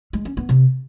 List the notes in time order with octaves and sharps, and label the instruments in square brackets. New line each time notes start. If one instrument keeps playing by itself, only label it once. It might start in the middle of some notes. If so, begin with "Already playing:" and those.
[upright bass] G#3
C#4
B3
C3